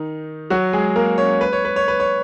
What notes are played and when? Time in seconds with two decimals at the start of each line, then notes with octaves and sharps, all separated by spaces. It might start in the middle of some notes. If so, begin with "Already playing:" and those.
Already playing: D#3 D#4
0.50 F#3 F#4
0.73 G#3 G#4
0.96 A#3 A#4
1.18 C#4 C#5
1.41 B4
1.53 C#5
1.65 B4
1.76 C#5
1.88 B4
2.00 C#5